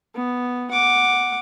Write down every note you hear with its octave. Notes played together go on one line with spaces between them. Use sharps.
B3
F#5 D6